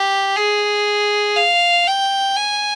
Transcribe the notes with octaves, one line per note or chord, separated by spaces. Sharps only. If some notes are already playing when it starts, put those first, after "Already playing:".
Already playing: G4
G#4
F5
G5
G#5